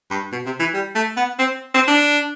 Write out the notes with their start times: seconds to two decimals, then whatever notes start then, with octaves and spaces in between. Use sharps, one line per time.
0.10 G2
0.32 B2
0.46 C3
0.59 E3
0.74 G3
0.95 A3
1.17 B3
1.39 C4
1.74 C4
1.88 D4